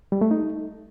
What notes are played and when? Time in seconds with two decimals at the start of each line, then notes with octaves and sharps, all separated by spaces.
0.12 G3
0.21 A3
0.31 D#4